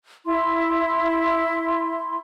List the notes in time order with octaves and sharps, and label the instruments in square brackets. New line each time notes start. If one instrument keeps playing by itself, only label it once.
[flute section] E4 C6